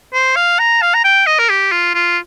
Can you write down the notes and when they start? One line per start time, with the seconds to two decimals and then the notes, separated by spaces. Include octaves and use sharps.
0.14 C5
0.36 F5
0.59 A#5
0.82 F5
0.95 A#5
1.04 G5
1.27 D#5
1.39 A#4
1.49 G4
1.72 F4
1.95 F4